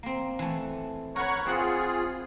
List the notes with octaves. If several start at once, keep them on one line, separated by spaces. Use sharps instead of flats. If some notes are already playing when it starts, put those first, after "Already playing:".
A#3 C4
E3 A3
A#4 B4 C#5 F#5 C#6
C4 F4 G#4 F#5